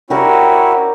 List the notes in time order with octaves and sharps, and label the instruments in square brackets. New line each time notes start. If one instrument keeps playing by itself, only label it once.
[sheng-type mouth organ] C#4 E4 F#4 [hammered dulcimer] G4 A#4 D5